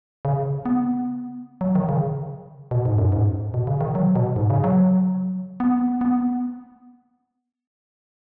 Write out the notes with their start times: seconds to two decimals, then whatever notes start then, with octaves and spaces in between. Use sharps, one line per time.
0.25 C#3
0.66 B3
1.61 F#3
1.75 D#3
1.89 C#3
2.71 B2
2.85 G#2
2.98 F#2
3.12 G#2
3.54 B2
3.67 C#3
3.81 D#3
3.95 F#3
4.16 B2
4.36 G#2
4.50 C#3
4.64 F#3
5.60 B3
6.01 B3